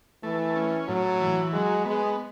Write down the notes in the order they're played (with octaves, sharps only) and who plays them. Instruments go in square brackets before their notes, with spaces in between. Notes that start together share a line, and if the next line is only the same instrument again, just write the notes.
[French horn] E3 [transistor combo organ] A3
[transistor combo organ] C#4
[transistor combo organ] A2 [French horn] F#3
[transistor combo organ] E3
[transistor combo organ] F#3 [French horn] G#3
[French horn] G#3 [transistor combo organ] B3